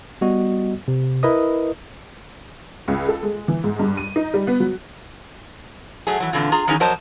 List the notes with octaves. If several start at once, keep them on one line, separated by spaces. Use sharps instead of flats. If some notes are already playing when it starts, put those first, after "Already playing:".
G3 B3 F#4 D#5
C3
E4 A#4 B4 D#5 D#6
C#2
A4
G#3
E3
G#2
G2
D#7
D#4
G3
B3
F#3
F#3 A3 G#4
E3 F#3
A#2 D3 E3 C4 F4
F4 G#4 A#5
D#3 E3 F#3 C#4 D#4 G#4
F2 F#3 A#4 C5 D#5 A5